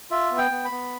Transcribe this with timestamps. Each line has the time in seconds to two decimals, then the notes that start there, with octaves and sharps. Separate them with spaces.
0.11 F4 E5
0.31 B3
0.38 G5
0.51 B3
0.65 B5
0.71 B3